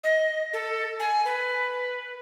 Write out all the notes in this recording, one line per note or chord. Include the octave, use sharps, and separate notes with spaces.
D#5
A4
G#5
B4